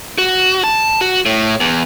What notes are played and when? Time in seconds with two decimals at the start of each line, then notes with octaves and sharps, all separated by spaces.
0.18 F#4
0.64 A5
1.01 F#4
1.26 A2
1.60 E2